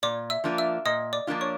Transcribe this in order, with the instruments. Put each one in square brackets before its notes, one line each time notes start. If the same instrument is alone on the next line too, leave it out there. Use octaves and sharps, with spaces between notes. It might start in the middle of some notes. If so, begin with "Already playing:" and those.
[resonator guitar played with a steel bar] A#2 [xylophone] D5 D6
[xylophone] E5 E6
[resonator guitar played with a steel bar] F3 A#3 D4 F4
[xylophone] E5 E6
[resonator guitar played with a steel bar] A#2 [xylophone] D#5 D#6
[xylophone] D5 D6
[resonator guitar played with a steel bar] F3 A#3 D4 F4
[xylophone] C#5 C#6